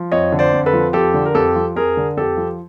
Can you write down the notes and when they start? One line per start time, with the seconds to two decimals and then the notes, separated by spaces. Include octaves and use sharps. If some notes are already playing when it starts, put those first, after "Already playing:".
Already playing: F3
0.12 F2 C#5 D#5
0.32 D3
0.39 C5 D5
0.53 F2
0.66 A4 B4
0.73 F3
0.93 F2 G4 A4
1.14 D3
1.26 A#4
1.34 F2 G4 A4
1.56 F3
1.76 F2 G#4 A#4
1.97 D3
2.17 F2 G4 A4
2.37 F3